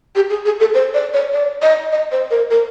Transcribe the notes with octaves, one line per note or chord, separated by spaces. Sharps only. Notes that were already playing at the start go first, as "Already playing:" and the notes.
G4
G#4
G#4
A4
C5
D5
C#5
D5
D#5
D#5
C5
A#4
A#4